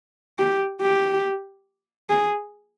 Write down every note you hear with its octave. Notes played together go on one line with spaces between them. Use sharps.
G4
G4
G#4